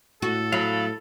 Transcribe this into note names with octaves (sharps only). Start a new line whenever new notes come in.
A2 F#4 A4
F#3 F5 B5